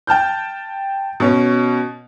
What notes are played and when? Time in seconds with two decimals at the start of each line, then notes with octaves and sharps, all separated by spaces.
0.07 G5 A5 F6 G6
1.20 B2 C#4